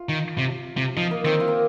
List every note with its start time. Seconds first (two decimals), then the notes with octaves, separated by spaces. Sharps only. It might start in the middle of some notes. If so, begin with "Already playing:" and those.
Already playing: F4
0.09 D#3
0.38 C3
0.77 C3
0.96 F3 D#4
1.11 A#3
1.25 D#3 C4
1.40 F4
1.48 A#3